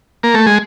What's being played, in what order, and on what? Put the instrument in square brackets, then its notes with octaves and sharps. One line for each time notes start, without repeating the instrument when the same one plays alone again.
[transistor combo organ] A#3
A3
G#3